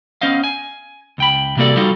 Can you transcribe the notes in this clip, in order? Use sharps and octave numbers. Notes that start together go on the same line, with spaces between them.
B3 C#4 C5 D#5 F5
G#5
C#2 G5 B5
C3 G3 A#3 F#4 A4 D5
G3 D#4 F4 F#4 A4